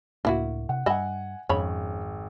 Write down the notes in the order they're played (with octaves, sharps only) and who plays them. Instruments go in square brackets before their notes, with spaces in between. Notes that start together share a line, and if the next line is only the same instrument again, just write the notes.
[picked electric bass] C#2 A2 D4 [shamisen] A#3 E4 F#4
[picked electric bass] C3 [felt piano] F#5
[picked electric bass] G2 [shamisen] D#5 E5 B5 [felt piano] F#5 G#5
[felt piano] G#1 [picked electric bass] F2 [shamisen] C#3 C#5 B5